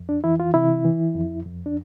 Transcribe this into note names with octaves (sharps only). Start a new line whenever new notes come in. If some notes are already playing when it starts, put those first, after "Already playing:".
Already playing: F2
D4
E3 E4
F4
C3 E4
E3
F2
F2
D4